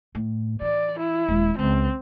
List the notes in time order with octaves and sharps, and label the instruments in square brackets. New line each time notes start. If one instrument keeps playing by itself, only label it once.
[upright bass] A2
[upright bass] E3 [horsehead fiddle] D5
[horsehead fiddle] E4
[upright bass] D#1 G#3
[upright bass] C#2 [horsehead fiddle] C4